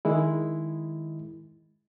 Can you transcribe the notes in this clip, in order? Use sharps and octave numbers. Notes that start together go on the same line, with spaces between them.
D#3 G#3 E4